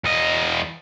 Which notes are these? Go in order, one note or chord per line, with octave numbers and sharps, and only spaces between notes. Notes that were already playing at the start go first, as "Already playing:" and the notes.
E2 D#5